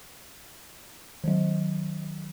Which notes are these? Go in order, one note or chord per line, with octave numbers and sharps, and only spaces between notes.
D#3 F#3